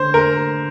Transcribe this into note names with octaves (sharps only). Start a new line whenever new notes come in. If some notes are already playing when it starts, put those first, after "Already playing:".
Already playing: D3 C5
A#4